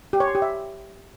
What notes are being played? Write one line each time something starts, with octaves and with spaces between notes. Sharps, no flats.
G4
C#5
C6
G4
E5